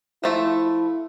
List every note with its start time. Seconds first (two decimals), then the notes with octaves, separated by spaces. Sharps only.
0.24 F3 A3 E4